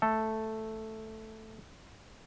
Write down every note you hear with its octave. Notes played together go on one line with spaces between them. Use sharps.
A3 A4